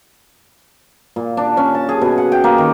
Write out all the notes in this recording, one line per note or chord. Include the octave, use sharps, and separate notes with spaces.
A#2
D4
C#4
A5
G#4
B2
F#5
G5
A#3
D#3